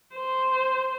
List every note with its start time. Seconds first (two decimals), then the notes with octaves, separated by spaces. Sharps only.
0.16 C5